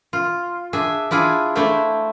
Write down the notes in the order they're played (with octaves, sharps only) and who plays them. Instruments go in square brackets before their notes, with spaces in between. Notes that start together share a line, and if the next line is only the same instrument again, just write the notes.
[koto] F4
D4 G#4 E5
D4 E4 F4 G#4
A3 D4 E4 C5